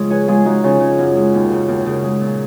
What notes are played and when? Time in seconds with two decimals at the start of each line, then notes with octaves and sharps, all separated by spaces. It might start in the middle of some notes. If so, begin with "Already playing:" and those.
Already playing: F2 C#3 G#3 F4
0.10 G#4 B4 C#5
0.28 G#3 F4 G#4
0.45 G#3 D#4 F#4
0.64 C#3 C#4 F4
0.81 C#3
0.98 F#2
1.16 G#3
1.34 D#2
1.51 C#3
1.68 D#2
1.86 C#3
2.04 G#3
2.21 A#2